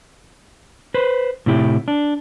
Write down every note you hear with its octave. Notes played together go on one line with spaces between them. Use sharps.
B4 C5
A2 C3 E4 G4
D4